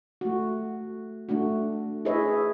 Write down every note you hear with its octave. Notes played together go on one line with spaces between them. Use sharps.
A3 F#4
A3 D4 F#4
E4 G#4 B4 C#5 D#5 E5